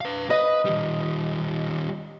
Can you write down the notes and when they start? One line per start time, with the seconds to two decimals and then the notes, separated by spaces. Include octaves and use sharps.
0.01 B4 F5
0.30 B4 D#5 B5
0.65 D#3 G3